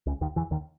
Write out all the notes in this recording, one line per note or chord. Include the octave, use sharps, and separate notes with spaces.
C#2 C#3
D#2 D#3
E2 E3
D#2 D#3